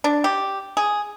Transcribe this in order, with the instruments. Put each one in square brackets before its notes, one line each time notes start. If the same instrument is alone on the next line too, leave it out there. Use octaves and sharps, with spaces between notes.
[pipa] D4
G4
G#4